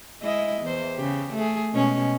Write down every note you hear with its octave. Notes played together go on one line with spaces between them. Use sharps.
G#3 E4 D#5
E2 C5
C#3 G4
A3 G#4
B2 G#3 C#4